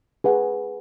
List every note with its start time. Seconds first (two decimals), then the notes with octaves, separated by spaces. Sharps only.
0.24 G#4 B4 F#5